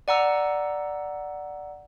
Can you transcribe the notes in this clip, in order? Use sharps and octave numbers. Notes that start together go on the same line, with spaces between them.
D5 F#5 A#5 E6